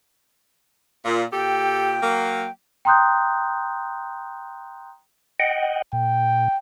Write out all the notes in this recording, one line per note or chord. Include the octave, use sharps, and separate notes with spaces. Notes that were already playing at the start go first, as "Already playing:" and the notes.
A#2
A#2 G4 A4 G5
F#3 A#3
G5 A#5 C6 D#6 F#6 G6
D#5 F#5 G5
A#2 G5